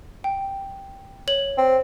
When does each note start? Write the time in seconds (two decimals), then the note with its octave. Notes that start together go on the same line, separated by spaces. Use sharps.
0.24 G5
1.28 C#5 F#7
1.58 C4